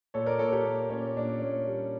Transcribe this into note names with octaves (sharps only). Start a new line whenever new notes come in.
A#2 A4 C#5
A#4 D5
A#2 A4 C#5
G4 A#4
A#3
A#2 C#4
A#2 D4
A#2 C#4
G3